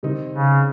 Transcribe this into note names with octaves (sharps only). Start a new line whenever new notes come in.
C3 D#3 G3 C4 D#4
C#3